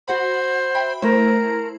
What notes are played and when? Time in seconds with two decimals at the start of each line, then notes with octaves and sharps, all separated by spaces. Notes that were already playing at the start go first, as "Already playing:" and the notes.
0.08 F#4 C5 F#5 B5
0.75 E5 G5 B5
1.02 A3 E4 A#4 C5